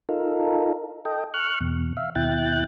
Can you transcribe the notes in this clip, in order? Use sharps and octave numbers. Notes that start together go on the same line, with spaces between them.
D#4 F4 A4 A#4
A4 D#5 G5
C#6 F6 F#6
E2 B2
E5 F5
D#2 B2 E4 G5 F#6 A6